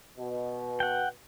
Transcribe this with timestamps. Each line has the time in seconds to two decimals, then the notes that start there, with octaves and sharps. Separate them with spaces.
0.18 B2
0.80 F#5 G5